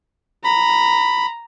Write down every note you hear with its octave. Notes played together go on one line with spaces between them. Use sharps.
A#5 B5